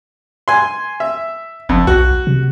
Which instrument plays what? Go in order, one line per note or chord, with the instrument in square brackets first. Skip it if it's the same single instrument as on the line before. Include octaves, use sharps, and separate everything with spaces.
[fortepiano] G#5 C6
E5
[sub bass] F#1 [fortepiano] F2
[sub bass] B1 [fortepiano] F#4
[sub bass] C3